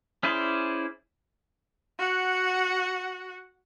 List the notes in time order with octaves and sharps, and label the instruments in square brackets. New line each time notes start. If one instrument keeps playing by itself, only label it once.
[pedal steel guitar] C#4 E4 G#4 C5 D5
[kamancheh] F#4 F#5